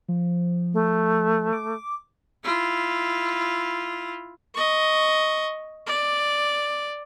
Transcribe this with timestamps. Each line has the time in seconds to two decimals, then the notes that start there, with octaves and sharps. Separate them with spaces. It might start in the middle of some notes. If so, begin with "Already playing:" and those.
0.09 F3
0.73 A3
1.53 D6
2.44 E4 F4
4.54 D#5 C#6
5.87 D5